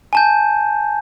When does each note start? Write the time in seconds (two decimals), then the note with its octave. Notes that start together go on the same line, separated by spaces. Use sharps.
0.13 G#5 A5 G6